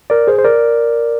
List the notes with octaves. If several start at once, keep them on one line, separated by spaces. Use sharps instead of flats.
A#4 D5
G#4 C5
C5
A#4 D5